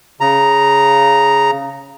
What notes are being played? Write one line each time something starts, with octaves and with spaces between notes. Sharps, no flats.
C#3 A#5